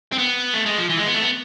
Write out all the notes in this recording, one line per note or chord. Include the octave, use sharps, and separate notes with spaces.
C4
B3
A3
G#3
F3
E3
G#3
B3
A3
B3